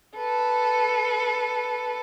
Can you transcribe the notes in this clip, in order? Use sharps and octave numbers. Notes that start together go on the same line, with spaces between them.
A4 B4